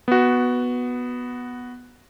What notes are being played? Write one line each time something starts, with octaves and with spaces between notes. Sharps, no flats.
B3 F#4